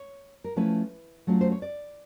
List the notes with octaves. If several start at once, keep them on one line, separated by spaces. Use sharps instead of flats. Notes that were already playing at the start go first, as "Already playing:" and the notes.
Already playing: C#5
A#4
F3 A3 C#4 E4 B4
F#3 A3 C#4 F4
C5
C#5
D5